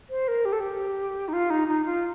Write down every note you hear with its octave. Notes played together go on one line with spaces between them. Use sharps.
C5
A#4
G4
A4
G4
D#4
F4
D#4
D#4
F4